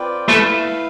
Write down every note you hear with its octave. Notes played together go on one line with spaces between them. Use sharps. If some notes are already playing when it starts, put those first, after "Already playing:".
Already playing: C4 F4 B4 D5 G5
A3 E4 B4 F5